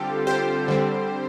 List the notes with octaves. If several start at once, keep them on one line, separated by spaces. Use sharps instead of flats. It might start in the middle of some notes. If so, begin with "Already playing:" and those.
Already playing: D3 G3 C4 F4 G4 A4
G4 C5
D3 G3 C4